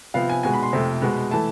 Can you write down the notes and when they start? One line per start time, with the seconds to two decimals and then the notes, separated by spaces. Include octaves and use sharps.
0.14 C3 F3 B3 F5
0.29 G#5
0.43 B2 G#3 B3 G#5
0.53 B5
0.63 C6
0.73 F2 C3 F3 A3
1.02 B2 G#3 B3
1.31 E3 A3 A5